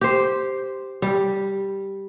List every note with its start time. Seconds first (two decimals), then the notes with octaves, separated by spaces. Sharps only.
0.01 G4 C5
1.02 G3